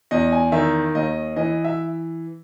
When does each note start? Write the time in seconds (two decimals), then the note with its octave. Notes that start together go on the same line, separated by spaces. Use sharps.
0.11 E2 D#5
0.32 G#5
0.52 D#3 E5
0.94 D#2 D#5
1.36 E3 D#5
1.64 E5